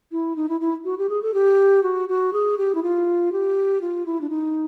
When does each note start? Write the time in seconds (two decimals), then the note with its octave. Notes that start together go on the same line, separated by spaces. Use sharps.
0.12 E4
0.36 D#4
0.49 E4
0.61 E4
0.85 F#4
0.98 G4
1.09 G#4
1.22 A4
1.34 G4
1.83 F#4
2.09 F#4
2.33 G#4
2.58 G4
2.75 E4
2.83 F4
3.32 G4
3.81 F4
4.06 E4
4.21 D4
4.29 D#4